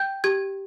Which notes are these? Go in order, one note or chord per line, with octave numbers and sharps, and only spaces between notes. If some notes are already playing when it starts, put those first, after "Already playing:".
Already playing: G5 G6
G4 G#6